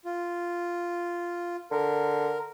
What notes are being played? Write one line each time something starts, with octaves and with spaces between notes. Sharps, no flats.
F4
D3 A#4